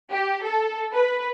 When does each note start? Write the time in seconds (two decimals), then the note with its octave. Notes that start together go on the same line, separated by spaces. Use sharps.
0.11 G4
0.44 A4
0.94 B4